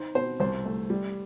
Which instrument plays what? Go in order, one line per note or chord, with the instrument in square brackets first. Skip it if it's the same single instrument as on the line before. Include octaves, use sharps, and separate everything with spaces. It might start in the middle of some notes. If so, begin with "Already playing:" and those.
Already playing: [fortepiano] D#4 C5
B2 C5
C2 C5
A3
G3